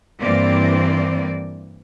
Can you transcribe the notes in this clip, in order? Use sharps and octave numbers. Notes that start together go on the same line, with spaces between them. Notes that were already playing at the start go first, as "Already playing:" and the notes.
G2 E3 A#3 C4 D5